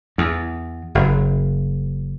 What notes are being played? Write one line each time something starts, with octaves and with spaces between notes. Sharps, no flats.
E2
F#1